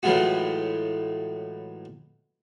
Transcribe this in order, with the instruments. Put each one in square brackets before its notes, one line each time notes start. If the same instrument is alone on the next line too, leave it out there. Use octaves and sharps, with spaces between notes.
[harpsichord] A2 E3 F#3 G#3 F4 F#4